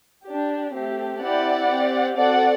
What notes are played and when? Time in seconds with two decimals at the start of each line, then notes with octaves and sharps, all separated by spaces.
0.25 G4
0.30 D4
0.74 A3 C4 G4
1.21 C4 E4 G4 D5 F#5
1.70 C4 G4
2.17 C4 F#4 A4 D5 F#5